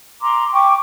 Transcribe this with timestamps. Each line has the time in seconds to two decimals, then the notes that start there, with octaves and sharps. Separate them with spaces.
0.22 A#5 C6 D6
0.53 G5 C#6 D6